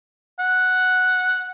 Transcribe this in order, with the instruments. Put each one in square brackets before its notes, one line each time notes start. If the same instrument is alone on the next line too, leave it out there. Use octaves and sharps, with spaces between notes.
[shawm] F#5